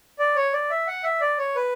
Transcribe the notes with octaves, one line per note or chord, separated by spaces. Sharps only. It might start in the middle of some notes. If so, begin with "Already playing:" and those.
D5
C#5
D5
E5
F#5
E5
D5
C#5
B4